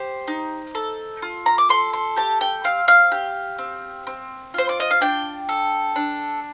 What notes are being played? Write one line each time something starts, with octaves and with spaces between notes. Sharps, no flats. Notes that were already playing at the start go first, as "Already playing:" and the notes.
Already playing: G4 C5
D#4
A4
F4
A#5
D6
A4 C6
C6
G4 A5
G5
C4 F5
F5
G4
C4
C4
F4 C5
D5
D#5
F5
D4 G5
A4
D4